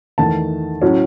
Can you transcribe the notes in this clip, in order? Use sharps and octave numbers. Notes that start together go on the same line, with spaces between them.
E2 D#3 A3 A5
A2 F#3 C#4